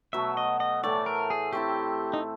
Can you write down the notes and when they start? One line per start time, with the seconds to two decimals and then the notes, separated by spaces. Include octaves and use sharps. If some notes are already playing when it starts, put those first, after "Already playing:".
0.13 B2 F#3 A3 E5
0.37 D#5
0.60 D#5
0.83 A2 E3 A3 D5
1.06 A#4
1.30 G#4
1.52 A3 C4 E4 G4
2.13 D#4